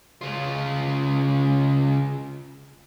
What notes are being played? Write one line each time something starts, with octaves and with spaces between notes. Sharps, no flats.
C#3 F4